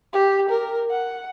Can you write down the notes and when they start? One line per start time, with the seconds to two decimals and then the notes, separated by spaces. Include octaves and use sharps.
0.13 G4
0.50 A#4
0.91 F#5